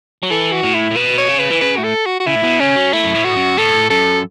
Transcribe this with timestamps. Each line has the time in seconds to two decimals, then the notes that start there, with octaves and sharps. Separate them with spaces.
0.23 F#3
0.30 E3 A4
0.52 F#4
0.64 A2
0.74 E4
0.91 A2
0.96 B2 B4
1.18 C#5
1.29 C#3
1.39 B4
1.50 E3
1.61 C#3 B4
1.76 A2 F#4
1.84 A4
2.06 F#4
2.20 F#4
2.27 C#3 E4
2.36 A2
2.44 B2
2.60 C#3 C#4
2.76 F#3
2.93 A3 E4
3.04 F#2
3.15 A2
3.25 F#4
3.37 F#2
3.58 A2 A4
3.90 F#2 A4